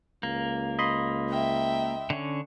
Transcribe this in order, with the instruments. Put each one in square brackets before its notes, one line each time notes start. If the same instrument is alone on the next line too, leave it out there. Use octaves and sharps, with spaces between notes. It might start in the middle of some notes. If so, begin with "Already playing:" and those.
[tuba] C#2 [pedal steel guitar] A#3
[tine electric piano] D#5 B5 C6
[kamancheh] E5 G5
[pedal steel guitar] D3 C#4